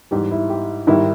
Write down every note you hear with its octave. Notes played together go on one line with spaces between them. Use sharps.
G#2 E3 G3 G4
E4
G4
G#2 D#3 G3 E4